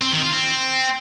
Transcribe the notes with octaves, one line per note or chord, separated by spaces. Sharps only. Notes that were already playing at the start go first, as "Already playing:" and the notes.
C4
D#3
F4
C4